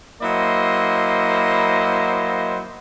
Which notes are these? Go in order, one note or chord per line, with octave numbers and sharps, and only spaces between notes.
F#3 A#3 E4 C5 D#5